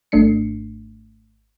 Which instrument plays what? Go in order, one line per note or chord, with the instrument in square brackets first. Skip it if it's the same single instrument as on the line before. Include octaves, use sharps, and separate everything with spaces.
[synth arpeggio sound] G#1 G#2 A3 D4 C7 C#7